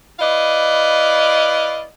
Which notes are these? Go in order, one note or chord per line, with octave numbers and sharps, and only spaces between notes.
E4 B4 D5 D#5 F5